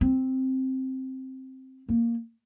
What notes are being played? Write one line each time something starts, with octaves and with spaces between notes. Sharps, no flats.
C4
A#3